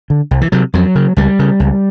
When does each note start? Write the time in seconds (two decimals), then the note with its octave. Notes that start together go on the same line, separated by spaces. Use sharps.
0.10 D3
0.31 C2
0.41 E3
0.52 C3 F#3
0.74 F2 F#3
0.95 C#3
1.17 C#2 G3
1.39 C#3
1.60 C#2